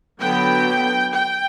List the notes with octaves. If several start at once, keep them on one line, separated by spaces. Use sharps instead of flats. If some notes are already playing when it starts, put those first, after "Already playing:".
D3 F#3 B3 G5
G5